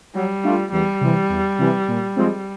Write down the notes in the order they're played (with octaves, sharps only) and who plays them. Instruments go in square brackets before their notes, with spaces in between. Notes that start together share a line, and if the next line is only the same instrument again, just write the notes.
[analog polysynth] F#3 [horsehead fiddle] G3
[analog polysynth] A3 D4 F4
[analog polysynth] E2 [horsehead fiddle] G3
[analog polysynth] C3 E3
E2
C3 E3
A#2
F3 G#3 C4